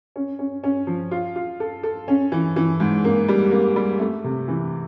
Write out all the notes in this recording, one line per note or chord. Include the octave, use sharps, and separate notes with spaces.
C#4
C#4
C#4
F3
F4
F4
A4
A4
C#4
E3
E3
G#2
A#3
G3
A#3
G3
A3
C3
E3